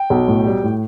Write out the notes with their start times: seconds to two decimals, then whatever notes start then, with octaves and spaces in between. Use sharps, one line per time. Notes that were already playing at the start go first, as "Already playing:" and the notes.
Already playing: G5
0.10 B1
0.28 A2
0.46 G3
0.63 A2